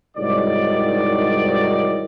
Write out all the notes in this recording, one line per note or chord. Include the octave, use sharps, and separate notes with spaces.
C2 G#2 D#3 F#3 C#5 D5